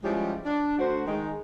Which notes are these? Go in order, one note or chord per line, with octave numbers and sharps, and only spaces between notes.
F3 G3 G#3 C#4 E4 G4
D4
D2 F#4 C5
D#3 G#3